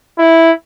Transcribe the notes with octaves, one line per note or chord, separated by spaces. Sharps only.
E4